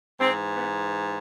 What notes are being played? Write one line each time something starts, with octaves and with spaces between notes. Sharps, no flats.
G#2 E3 C4
B3